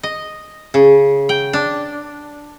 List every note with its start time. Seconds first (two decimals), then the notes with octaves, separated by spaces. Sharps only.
0.03 D#5
0.74 C#3
1.29 G5
1.53 D4